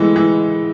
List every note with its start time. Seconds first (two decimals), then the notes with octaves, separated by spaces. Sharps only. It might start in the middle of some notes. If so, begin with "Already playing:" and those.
Already playing: E3 G#3 A3 B3
0.16 E3